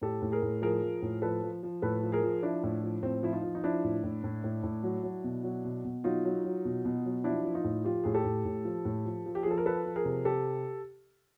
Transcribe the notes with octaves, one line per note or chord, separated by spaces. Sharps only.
A2 G4 A4
A2
G#4 A#4
A2
F3 G#4 A#4
F3
A2
F3 A4 B4
F3
F3
A2 A4 B4
F3
G#4 A#4
F3
F3 D4 E4
A2
F3
A2 C4
F3 E4
D#4 F4
F3
D#4
F3 D4 E4
A2
A2
A2
A2
A2
F#3
F#3
B2
F#3
B2
B2
F#3 D#4 F4
F#3
F#3
B2
B2
F#3
F3 D4 E4
F3
D#4 F4
A2
F3 F4 G4
A2 G#4
G4 A4
A2
A2
F3
A2
F3
F3
G4
G#4
F3 A4
A#4
F3 A4 B4
F3
G#4 A#4
C3
C3 G4 A4